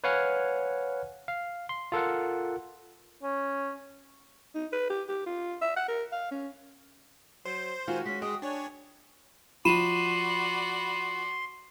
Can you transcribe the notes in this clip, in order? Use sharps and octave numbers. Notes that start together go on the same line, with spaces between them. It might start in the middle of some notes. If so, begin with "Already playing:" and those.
B4 C#5 F5 F#5 G#5 F6
F5
C6
F4 A4 A#4 F#5
C#4
D#4
B4
G4
G4
F4
E5
F#5
A#4
F5
C#4
F#3 C5 C7
D#3 G#3 F4 F#4 G#5
G#3 C#4 B6
G#3 G5 D#6
D4 C#5 G#5
F3 F#4 D5 B5 C6 D#7 E7